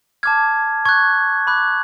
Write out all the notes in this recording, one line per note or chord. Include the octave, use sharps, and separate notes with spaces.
A5 D6 F6 G#6
C#6 F#6 G#6
B5 D6 F#6